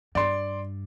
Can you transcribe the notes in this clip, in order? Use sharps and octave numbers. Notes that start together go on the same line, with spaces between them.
G2 D5 C6